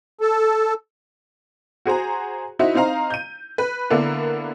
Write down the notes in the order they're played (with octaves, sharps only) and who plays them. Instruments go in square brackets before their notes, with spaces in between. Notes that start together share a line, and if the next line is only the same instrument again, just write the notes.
[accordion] A4
[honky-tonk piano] F#4 G#4 C5 A#5
D#4 E4 F#4 C5 E5
C4 D#4 C5 F5 A#5
G6 D#7
B4
D3 A#3 B3 D4 E4